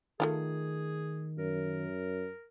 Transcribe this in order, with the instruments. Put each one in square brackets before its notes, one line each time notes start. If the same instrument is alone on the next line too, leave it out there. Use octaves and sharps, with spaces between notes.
[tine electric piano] D#3 [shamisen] A3 E4 F4 [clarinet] G#4
[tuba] F#2 [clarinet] A#4